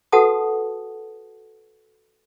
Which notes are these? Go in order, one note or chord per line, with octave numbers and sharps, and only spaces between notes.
F#4 A4 B4 F#5 A5 D#6